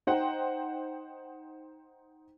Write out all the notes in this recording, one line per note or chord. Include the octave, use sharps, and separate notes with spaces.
D#4 C5 F#5 G5